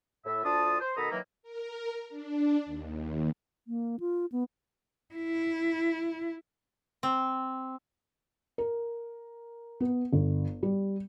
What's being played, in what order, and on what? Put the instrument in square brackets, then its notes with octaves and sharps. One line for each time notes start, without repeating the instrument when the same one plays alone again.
[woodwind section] A2 E5
D2 D4 F4 A5 D#6
C5
B2 D#3 A4 A#5 B5 D#6
D#3 E3 F#3 A#3
[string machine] A#4
D4
D#2
[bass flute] A#3
F4
B3
[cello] E4
[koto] C4
[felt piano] A#4
B3
G1
G3